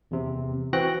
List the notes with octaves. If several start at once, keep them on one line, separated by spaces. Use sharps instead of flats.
E2 C3
E3 C4 F#4 G5 F#6 A#6